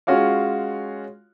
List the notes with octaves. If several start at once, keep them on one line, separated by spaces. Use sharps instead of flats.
G#3 C#4 F4 F#4 C#5 F5